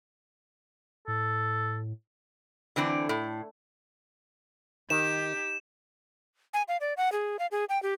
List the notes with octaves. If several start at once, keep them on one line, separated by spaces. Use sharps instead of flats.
A2 A4
D3 E3 C4 D4
A2
D#3 D#4 G4 E7
G#5
F5
D5
F#5
G#4
F5
G#4
G5
G4